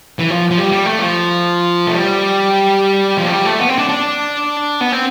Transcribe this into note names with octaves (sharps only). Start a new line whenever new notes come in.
E3
F3
F3
G3
G3
A3
F3
A3
G3
F3
A3
G3
A3
B3
C4
D4
D4
B3
C4